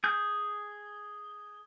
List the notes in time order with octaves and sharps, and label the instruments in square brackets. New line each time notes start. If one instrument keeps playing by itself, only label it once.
[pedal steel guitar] G#4 G6